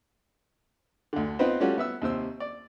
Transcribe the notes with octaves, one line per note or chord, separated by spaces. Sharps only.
D2 D3
B3 C4 D#4 F4 B4 C5
G3 A3 C#4 F4 F#4
B3 E5 E6
D#2 C3 C5 E6
D5